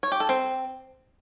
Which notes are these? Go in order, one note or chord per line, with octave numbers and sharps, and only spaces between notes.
C#5
G4
A4
C4